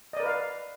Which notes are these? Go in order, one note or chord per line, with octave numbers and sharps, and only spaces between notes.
A#4 B4 D5 D#5 F5